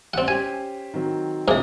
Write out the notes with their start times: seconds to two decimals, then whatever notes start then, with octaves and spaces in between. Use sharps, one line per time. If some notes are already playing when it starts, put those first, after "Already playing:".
0.14 A1 C4 D5 F#5
0.28 C#4 G4 C5 G#5 G#6
0.94 D#3 F#3 C4
1.48 A#1 B2 D#3 A#3 C#4 G#4 C5 E5